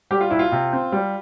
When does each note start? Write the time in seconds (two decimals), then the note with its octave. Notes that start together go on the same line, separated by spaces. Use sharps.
0.11 G3 G4
0.21 F4
0.30 C2 E4
0.39 F4
0.52 C3
0.73 C4
0.92 G3